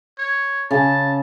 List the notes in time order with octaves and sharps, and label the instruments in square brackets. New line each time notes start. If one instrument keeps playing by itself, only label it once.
[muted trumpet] C#5
[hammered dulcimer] C#3 [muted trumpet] A5